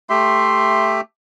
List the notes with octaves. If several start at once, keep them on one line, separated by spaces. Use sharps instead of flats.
A3 G4 E5 C6